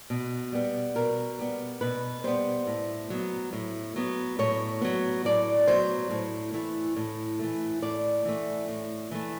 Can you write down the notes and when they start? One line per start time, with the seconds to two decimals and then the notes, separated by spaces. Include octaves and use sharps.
0.10 B2
0.52 G3 B3
0.95 B2 A#4
1.39 G3 B3
1.81 B2 B4
2.24 G3 B3 C5
2.67 A2
3.10 F#3 B3
3.53 A2
3.96 F#3 B3
4.39 A2 C#5
4.81 F#3 B3
5.25 A2 D5
5.67 F#3 B3 C5
6.11 A2
6.54 E3 A3
6.96 A2
7.39 E3 A3
7.82 A2 D5
8.25 E3 A3
8.69 A2
9.11 E3 A3